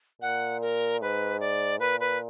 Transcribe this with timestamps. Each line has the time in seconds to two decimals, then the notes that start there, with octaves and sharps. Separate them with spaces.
0.22 A#2 F#5
0.62 A#4
1.02 G#2 B4
1.40 D5
1.80 A#2 B4
2.00 B4